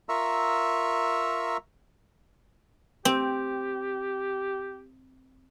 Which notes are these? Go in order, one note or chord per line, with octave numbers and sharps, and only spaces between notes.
F4 A#4 E5 A#5 C#6 E6
C4 G4